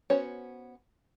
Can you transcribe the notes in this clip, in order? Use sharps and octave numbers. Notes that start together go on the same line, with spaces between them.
B3 C#4 F#4 C5 C#5